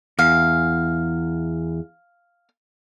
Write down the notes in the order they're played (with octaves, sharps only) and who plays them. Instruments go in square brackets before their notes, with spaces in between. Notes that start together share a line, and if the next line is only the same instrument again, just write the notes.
[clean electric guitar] E2 [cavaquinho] F5